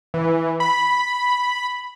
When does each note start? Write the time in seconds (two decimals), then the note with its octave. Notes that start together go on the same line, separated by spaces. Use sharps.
0.14 E3
0.60 B5